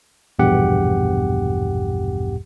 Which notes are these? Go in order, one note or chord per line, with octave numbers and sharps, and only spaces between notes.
A#1 E2 G2 B2 G4 F#5